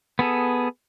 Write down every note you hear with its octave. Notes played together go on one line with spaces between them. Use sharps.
B3 G#4 A4